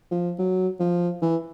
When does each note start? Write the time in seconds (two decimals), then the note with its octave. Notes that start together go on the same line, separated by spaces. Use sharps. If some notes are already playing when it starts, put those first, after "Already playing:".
0.11 F3
0.38 F#3
0.80 F3
1.22 E3